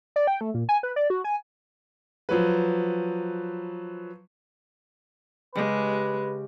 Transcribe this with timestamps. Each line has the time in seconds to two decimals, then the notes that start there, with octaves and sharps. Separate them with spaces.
0.16 D5
0.27 G5
0.41 A3
0.54 A#2
0.69 G#5
0.83 B4
0.96 D5
1.10 F#4
1.24 G#5
2.29 F3 F#3 B4
5.55 C#3 G#3 G4 B4